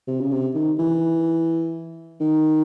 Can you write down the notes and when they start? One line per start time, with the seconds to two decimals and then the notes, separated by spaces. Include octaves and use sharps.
0.07 C3
0.20 C#3
0.31 C3
0.55 D#3
0.79 E3
2.21 D#3